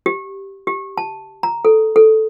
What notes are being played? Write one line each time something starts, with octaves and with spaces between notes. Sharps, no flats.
G4
G4
A5
A#5
A4
A4